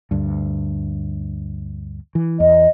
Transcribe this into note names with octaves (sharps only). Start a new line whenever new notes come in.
D2 G2
E3
E2 D#5